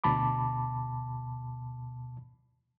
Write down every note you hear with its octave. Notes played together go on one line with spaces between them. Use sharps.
D2 B2 A5 B5 D6